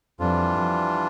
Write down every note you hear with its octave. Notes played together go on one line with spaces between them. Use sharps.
F2 E3 G3 D4 F4
F2